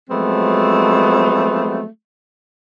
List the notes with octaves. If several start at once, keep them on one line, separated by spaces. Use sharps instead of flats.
F3 F#3 G#3 A3 B3 C4